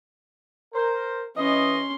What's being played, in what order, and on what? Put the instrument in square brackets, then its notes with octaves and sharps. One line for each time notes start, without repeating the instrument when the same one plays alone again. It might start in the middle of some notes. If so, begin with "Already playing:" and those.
[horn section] A#4 C5
[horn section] E3 D#5 [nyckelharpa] C#4 C6